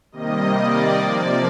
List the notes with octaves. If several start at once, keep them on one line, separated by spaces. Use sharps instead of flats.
C3 D#3 G3 A#3 D#5
D5
C3 F3 A#3